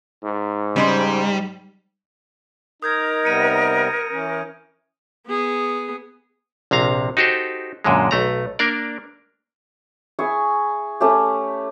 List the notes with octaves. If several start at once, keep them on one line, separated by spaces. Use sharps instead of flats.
G#2
C#3 G3 D#4 C5
D#4 A#4 D#6 G6 G#6
C3 G3 B3 C#7 D#7
E3 C#4
B3 G#4
A#1 C3 F5 A#5
D#4 F#4 G4 A4 C5
F#2 A#2 D3 G#3
B1 A3 A#5
A#3 D4 A#4 D5
E4 G#4 G#5 C#6
A3 C#4 E4 G4